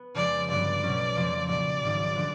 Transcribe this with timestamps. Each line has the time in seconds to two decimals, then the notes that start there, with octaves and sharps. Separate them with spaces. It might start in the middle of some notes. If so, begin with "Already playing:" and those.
Already playing: B3
0.14 F2 C#3 F3 G#3 D5
0.49 G1 G2 D3 F#3 B3 D5
0.83 B1 B2 F#3 A3 C#4
1.15 F2 C#3 F3 A3 C4
1.48 B1 A#2 F#3 D5
1.83 G#1 G#2 D#3
2.15 D3 F3 A3